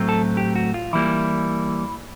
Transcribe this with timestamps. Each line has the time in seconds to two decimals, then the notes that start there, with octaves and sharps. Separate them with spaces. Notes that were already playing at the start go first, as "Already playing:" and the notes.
Already playing: A2 F#3 A3 C4
0.09 A4
0.37 G4
0.55 F#4
0.74 F4
0.93 E3 G3 A#3 E4